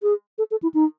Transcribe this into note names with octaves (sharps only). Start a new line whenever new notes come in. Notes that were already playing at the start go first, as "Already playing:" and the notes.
G#4
A4
A4
E4
D#4